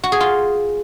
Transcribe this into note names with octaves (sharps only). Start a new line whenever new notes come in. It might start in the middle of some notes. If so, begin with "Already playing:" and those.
F#4
G#4
F4